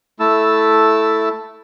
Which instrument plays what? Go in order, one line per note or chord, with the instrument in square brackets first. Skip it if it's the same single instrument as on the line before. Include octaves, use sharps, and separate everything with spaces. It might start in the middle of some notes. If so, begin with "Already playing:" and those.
[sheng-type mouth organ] A3 E4 A5 E6